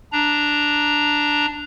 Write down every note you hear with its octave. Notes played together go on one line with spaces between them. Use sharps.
D4 A#5